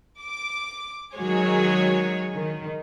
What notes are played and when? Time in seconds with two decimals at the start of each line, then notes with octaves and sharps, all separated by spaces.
0.21 D6
1.15 D#3 F#3 G#3 F#4 G#4 C#5
2.35 D#3